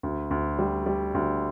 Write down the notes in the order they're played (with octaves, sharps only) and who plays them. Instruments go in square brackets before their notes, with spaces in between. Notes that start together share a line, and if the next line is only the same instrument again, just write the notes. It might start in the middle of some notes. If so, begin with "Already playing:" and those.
[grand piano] D2
D2
G3
G3
D2